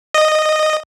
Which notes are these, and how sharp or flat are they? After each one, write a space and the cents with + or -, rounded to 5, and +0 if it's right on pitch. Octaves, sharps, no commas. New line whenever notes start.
D#5 -10